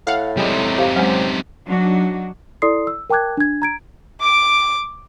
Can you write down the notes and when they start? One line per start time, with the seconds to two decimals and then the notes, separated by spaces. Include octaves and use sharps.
0.07 A2 F5 F#5
0.37 C3 G3 G#3 D#4
0.78 G4 C5 F5
0.96 F#3 G#3 C4 C#4
1.66 F#3 D4 D#4 F#4
2.62 E4 A4 D5 C6 D#6 C7
2.87 E6
3.10 A#4 G5 A5 D6 F#6 G#6
3.37 D4 G#6
3.62 A#5 G#6 D7
4.20 D6 D7